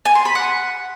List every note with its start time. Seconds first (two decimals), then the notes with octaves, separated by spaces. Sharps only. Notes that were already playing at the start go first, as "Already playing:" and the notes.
0.05 G#5
0.15 C6
0.25 B5
0.35 F#5